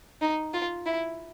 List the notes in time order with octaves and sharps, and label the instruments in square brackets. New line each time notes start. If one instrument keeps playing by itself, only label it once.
[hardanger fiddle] D#4
F4
E4